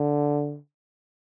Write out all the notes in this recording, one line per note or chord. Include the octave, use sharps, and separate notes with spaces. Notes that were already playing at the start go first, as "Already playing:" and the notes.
Already playing: D3